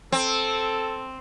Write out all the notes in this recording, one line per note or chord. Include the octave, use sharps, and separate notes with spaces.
C4 A4